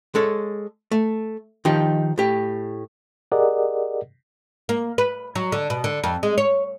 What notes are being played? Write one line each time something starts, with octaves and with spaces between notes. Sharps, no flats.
G#3 A4 C#5
A3
D#3 F3 D#4 G4
A2 G4
G4 G#4 A#4 D5 D#5 F#5
A#3
B4
F#3
D3
B2
D3
F2
G#3
C#5